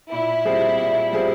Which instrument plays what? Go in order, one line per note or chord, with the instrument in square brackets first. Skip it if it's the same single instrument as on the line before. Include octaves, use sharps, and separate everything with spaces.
[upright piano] A#2 [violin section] E4
[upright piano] G3 C4 F4 G#4
A#2
G3 C4 F4 G#4